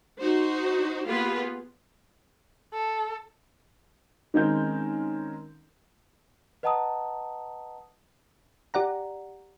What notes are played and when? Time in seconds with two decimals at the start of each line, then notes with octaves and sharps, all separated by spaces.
0.18 D#4 F#4 C5
1.04 A#3 B3 F4 G4 G#4 B4
2.74 A4
4.34 D#3 G#3 C4 C#4 A#4 G6
6.63 B4 D#5 F#5 A5 A#5 D#6
8.74 G4 D5 F#5 A#5